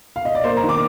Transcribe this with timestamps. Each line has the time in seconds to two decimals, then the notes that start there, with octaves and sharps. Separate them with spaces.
0.16 F5
0.25 D#5
0.35 D5
0.44 A#3 C5
0.57 A#5
0.63 D#3
0.69 D6